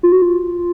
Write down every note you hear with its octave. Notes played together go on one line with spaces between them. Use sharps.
F4
F#4
F4